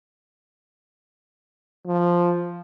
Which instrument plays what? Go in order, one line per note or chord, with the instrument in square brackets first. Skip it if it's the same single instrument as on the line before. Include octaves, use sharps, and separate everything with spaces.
[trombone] F3